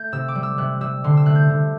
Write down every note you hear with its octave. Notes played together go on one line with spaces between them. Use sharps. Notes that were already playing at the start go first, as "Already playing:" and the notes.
Already playing: A3 G6
C3 E6
D6
G3
E6
C3 F#6
G3 E6
D3 C6
E6
A3 F#6
G6
D3